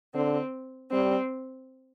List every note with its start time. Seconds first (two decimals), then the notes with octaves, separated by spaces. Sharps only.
0.14 D3 C4
0.92 G3 C4